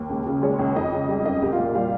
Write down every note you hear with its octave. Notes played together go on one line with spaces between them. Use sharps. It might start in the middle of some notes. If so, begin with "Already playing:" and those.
Already playing: D#2
C#2
C#3
G#3 C#4 C#5
C#2
F2 D#4 D#5
C#3
G3
F2 D#4 D#5
C2 G4
F4
A#2
G3 F4 F5